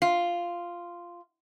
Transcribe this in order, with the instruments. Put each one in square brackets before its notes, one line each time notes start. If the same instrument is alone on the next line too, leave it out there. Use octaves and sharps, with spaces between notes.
[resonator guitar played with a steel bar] F4